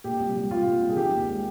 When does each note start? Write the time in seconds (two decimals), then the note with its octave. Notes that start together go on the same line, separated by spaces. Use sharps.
0.04 A#2 G4
0.19 C2
0.35 G3
0.50 C2 F4
0.66 A#2
0.81 C2
0.90 G#4
0.96 D#3 G4
1.12 D#2
1.28 G#3